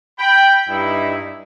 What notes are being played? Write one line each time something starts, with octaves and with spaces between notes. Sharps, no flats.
G5 B5
G2 D#4 E4